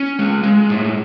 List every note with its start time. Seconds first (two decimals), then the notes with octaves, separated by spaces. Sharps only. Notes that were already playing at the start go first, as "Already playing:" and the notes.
Already playing: C#4
0.19 G#3
0.44 G#3
0.69 A2